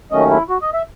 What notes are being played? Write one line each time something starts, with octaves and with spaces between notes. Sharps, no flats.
D#2 D#3 F#3 A3 C#4 D#5
E4
F#4
D#5
E5